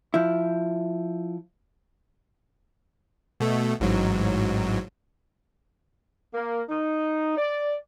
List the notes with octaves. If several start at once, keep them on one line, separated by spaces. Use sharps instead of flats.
F3 E4
B2 A3
A1 G#2 F#3
A#3
D#4
D5